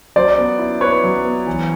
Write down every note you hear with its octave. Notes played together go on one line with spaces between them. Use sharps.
F#3 C5 D5
B3
E4
E4 B4 C#5
F#3
B3
E3